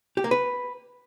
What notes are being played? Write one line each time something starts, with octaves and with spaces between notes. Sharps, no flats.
G4
A#3
B4